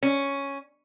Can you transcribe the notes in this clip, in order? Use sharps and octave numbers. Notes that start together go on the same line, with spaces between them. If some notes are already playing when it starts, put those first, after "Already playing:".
C#4